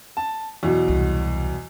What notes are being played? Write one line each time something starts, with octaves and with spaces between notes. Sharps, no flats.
A5
E2 B2 F#3
C2